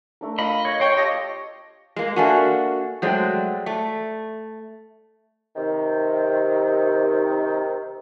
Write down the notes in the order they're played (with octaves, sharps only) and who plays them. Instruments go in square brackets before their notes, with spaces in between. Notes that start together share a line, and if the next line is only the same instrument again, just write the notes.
[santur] A3 D4 A#4
[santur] F4 F5 [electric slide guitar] D#5 [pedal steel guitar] B5
[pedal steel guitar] C#5
[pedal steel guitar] C5 G5 [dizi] C#5
[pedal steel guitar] G4 A4 C#5 [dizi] D#5 [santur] E6
[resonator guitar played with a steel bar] G#3 A#3
[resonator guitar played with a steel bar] A#3 D4 F#4 [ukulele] A4 E5 G#5
[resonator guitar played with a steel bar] F#3 G#3 A3 [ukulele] C5 D5 G5
[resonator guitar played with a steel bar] A3
[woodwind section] C3 D#3